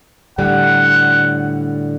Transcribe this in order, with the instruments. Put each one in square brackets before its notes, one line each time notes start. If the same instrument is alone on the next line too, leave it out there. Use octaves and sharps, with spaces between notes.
[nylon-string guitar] A2 D3 G3 [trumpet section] F#5